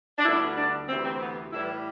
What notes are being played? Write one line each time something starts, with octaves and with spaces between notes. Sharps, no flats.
D4
D2 D3 G3 B3 E4
D4
D2 C3 E3 C4
C4
B3
A2 E3 G3 E4